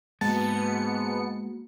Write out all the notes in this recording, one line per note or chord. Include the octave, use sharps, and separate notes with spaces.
G#2 G#3 A#3 B3 F#4 A5 A6 C#7